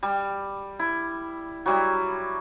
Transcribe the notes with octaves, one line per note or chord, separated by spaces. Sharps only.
G3
E4
F#3 G3 E4